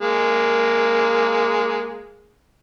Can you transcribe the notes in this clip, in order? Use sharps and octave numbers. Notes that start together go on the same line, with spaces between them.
G#3 A#3